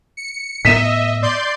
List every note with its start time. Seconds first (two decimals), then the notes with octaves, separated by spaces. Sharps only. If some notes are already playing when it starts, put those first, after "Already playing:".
0.17 C#7
0.65 A2 B3 D#5 E5 B6 D#7 E7
1.22 D5 C6 G6